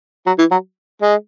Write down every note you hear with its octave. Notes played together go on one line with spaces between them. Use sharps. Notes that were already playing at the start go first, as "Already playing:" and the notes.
F#3
E3
F#3
G#3